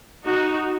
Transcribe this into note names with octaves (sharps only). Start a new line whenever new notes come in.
D#4 F#4